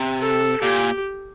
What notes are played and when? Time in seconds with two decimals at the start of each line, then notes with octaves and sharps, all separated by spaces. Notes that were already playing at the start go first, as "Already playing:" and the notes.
Already playing: C3
0.20 A4
0.62 A#2 G4